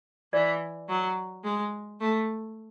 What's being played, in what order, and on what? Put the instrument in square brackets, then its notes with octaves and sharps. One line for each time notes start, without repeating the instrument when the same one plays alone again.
[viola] E3 [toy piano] D5
[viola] F#3
G#3
A3